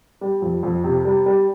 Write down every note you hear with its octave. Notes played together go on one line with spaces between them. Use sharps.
G3
F2
F2
C3
G3
G3